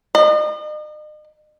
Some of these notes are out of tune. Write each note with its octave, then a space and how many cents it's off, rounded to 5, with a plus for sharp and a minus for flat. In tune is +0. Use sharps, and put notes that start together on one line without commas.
D#5 -40